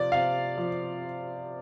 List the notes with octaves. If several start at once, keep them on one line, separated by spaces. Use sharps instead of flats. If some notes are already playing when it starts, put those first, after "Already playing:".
Already playing: C3 F3 D5
C3 F5
F3